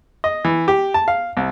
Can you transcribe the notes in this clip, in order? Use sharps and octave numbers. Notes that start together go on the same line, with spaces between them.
D#5
E3
G4
A5
F5
C2